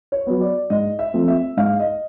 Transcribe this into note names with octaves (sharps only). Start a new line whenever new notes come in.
C#5
F#3 B3
D5
G#2 D#5
E5
F3 A3 C4
E5
G#2 F5
D#5